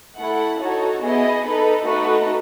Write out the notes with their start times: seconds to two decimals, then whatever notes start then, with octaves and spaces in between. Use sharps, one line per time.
0.16 A3 E4 A4 F#5
0.59 D#4 F#4 A4 C#5
1.02 B3 E4 G#4 D#5
1.44 D#4 A4 B4
1.87 A3 D#4 F#4 B4